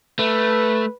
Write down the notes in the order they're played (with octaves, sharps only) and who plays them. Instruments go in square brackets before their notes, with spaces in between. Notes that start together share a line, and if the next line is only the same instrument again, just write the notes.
[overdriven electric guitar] A3 [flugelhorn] B4